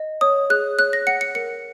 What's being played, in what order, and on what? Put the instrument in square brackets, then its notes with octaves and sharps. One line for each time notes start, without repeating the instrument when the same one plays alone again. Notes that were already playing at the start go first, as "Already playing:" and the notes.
Already playing: [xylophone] D#5
C#5 D#6
G#4 F#6
C#5 F#6
A#6
F#5 C#7
C#7
A#4 C#7